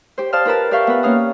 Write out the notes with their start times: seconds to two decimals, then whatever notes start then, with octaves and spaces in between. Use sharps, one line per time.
0.18 G4 C5
0.33 C5 D5 F5 A5 D#6 F6
0.45 F4 A#4 B4 A5
0.71 G4 D5 E5 F5 C#6 G6
0.87 B3 B4
1.03 A#3 C#4 F5 D#6